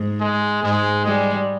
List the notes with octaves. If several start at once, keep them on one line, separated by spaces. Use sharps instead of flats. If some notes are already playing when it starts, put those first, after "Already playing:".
Already playing: G#2
G#3
G#2 G#3
G3 G#3